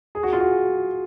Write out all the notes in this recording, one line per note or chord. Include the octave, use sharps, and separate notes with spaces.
G#4
F#4
F4
F#4